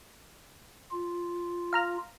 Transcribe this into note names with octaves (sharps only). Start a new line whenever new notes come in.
F4
F5 A#5 F6